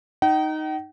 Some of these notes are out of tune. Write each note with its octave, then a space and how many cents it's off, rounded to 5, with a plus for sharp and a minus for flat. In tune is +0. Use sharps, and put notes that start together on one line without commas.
D#4 +0 G5 -45